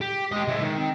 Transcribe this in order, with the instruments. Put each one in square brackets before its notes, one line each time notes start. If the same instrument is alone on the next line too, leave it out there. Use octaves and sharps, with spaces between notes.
[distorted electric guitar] G4
[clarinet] G#3 [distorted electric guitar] G4 D#5
[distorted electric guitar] C#3 E4
D#3
[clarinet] C4